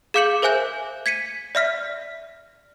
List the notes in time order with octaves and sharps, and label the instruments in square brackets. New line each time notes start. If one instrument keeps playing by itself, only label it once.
[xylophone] G#4 F5 D6 G6 C#7 F#7
A#4 C5 E5 G#5 F#6 G6
G#6 B6 C#7 D#7
D5 E5 F6 B6